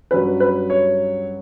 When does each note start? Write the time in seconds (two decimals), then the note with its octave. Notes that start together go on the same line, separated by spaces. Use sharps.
0.11 G2 F#3 C#4 B4
0.40 B4
0.70 C#5